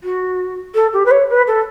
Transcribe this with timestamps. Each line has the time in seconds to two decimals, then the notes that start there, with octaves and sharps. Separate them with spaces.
0.03 F#4
0.74 A4
0.93 G4
1.05 B4
1.11 C#5
1.29 B4
1.47 A4